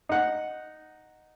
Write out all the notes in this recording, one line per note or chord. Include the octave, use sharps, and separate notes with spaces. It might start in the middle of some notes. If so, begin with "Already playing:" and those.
D#4 F#5